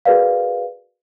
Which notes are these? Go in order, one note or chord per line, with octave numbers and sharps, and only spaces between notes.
F#4 G#4 A#4 B4 D5 F5